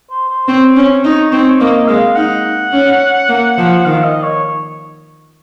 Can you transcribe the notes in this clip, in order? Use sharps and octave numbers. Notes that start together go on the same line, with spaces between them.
C5
C5
C4 C#5
C#4
D#4
C4
A#3 D#5
G#3 F5
D#4 F#5
C#4
A#3
F3
D#3 F5
D#5
C#5